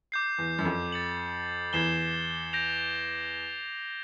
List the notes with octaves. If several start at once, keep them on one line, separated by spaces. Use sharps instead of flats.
D6 G6 C7
E2
F#2
F2
A6 C#7 F#7
E2 G#6 C7 E7 G7
G6 A#6 D7 F7